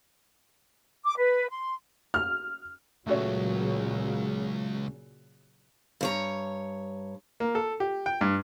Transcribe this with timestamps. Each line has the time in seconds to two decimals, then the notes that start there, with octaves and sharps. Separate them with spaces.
1.04 D6
1.17 B4
1.50 C6
2.14 F6
3.07 C#2 A#2 C#3 F#3 A3 F#4 C#5
6.01 G2 C#5 A#5
7.40 A#3
7.55 A4
7.80 G4
8.06 G5
8.21 G2